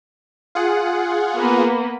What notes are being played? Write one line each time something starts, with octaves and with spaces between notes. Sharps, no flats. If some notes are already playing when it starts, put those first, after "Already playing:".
F4 G#4 F#5
A#3 B3 B4